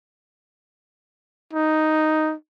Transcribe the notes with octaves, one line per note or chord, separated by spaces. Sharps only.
D#4